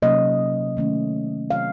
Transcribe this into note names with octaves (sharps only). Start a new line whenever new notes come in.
C3 F#3 A#3 C#4 D#5
D#3 A3 C#4
C3 D#3 F#3 C4 F5